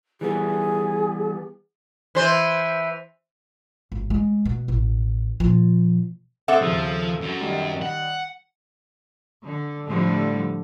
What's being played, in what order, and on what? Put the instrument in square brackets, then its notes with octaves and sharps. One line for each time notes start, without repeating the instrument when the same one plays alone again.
[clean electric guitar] E3 G3 B3 [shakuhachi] G#4
[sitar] E3 C5
[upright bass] G#1
G#3
B2
A1
A#2 F3
[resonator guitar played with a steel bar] C4 A4 E5 [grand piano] F#5 D6 D#6
[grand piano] D#2 C#3 [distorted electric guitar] F3
[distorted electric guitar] F#2
[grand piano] D#3 G3
[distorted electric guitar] F#5
[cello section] D3
A2 D3 F3 G3 A3